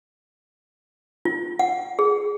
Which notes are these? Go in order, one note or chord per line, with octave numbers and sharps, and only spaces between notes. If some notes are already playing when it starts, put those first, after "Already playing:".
F4
F#5
G#4